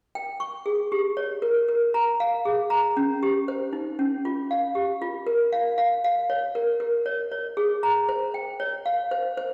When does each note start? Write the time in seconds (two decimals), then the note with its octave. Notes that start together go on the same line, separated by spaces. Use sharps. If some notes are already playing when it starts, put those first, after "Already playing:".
0.15 G5
0.40 C#6
0.66 G#4
0.92 G4
1.17 C#5
1.42 A#4
1.68 A#4
1.94 A#5
2.20 F5
2.45 G#4
2.70 A#5
2.97 C#4
3.23 G4
3.48 C5
3.73 D#4
3.99 C#4
4.25 F4
4.51 F5
4.75 G4
5.02 F4
5.27 A#4
5.53 F5
5.78 F5
6.04 F5
6.30 C#5
6.55 A#4
6.80 A#4
7.06 C#5
7.32 C#5
7.57 G#4
7.83 A#5
8.09 C5
8.34 G5
8.60 C#5
8.86 F5
9.11 C5
9.37 C5